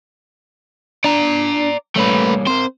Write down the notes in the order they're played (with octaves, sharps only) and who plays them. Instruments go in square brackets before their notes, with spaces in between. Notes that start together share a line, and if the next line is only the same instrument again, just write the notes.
[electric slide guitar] D4 [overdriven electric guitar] D5 A#5
[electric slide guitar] G3 A#3 C#5 [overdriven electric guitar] A3 B4
[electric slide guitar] C4 A#4 [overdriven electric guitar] C5